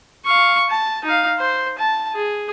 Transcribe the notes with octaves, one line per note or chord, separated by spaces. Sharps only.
F5 C#6
A5
D#4 F5
C5
A5
G#4